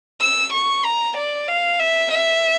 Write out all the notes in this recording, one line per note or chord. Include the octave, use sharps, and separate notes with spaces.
E6
C#6
A#5
D5
F5
E5
E5